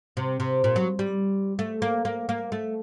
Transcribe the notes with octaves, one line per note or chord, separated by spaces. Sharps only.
C3
C3
A#2
F#3
G3
A3
A#3
A#3
A#3
A3